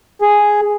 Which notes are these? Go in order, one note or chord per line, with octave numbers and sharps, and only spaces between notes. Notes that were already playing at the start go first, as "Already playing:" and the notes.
G#4